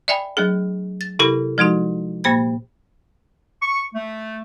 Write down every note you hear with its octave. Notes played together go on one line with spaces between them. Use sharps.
D5 E5 G5 G#5 B5
F#3 A3 D4 G#4
A6
C3 E4 G4 A#4 B5 A#6
F3 G#3 D#4 F#4
A#2 A#3 C5 B5 G#6
C#6
A3